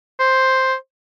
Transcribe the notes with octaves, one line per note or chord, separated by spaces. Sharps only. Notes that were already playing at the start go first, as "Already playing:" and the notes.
C5